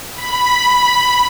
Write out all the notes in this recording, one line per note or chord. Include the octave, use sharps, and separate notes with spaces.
B5